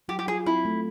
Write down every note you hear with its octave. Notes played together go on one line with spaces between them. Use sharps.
F#3 G4
G4
F4 G#4
C4 E4
A3